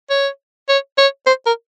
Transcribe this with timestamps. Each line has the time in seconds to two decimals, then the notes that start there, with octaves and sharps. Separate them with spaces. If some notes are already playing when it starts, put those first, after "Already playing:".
0.10 C#5
0.69 C#5
0.98 C#5
1.27 C5
1.46 A#4